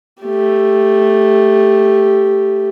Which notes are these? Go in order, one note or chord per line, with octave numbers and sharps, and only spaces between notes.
A3 G4